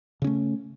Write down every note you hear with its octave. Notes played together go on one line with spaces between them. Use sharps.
C#3 A3 C#4